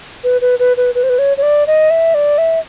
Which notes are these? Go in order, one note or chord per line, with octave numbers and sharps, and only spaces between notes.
B4
B4
B4
B4
B4
C5
B4
C#5
C#5
D5
D#5
E5
D5
E5